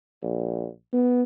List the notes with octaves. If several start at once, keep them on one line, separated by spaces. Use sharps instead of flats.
A#1
B3